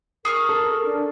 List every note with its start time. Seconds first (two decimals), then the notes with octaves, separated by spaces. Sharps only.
0.25 G#4 A#4 C#6 F6
0.49 A4
0.85 D4